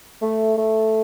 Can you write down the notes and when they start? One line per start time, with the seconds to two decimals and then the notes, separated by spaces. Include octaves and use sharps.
0.22 A3
0.58 A3